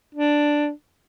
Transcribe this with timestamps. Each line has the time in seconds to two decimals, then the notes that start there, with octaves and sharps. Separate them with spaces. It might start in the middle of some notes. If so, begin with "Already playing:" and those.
0.15 D4